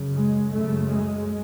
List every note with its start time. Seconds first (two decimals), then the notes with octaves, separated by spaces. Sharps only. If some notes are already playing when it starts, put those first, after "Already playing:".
Already playing: F#2 C#3
0.16 G#3
0.53 F#2 C#3 A3
0.89 G#3